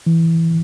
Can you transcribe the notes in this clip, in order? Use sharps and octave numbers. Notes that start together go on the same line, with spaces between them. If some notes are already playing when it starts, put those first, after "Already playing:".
E3